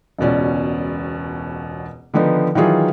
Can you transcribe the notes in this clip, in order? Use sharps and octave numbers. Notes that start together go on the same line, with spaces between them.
E1 C#2 B2 C#4 D5
D3 D#3 F3 B3 D#4
D#3 E3 F#3 F4 G#4